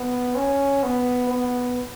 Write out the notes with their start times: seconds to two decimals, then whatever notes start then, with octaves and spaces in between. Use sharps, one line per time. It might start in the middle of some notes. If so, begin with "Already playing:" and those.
Already playing: B3
0.36 C#4
0.83 B3
1.29 B3